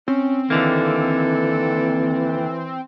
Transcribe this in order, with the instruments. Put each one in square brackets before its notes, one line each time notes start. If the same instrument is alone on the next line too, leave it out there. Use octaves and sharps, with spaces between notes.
[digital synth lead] C4 [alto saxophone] C#4
[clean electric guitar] D#2 D3 A#3 [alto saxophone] E3 [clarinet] A4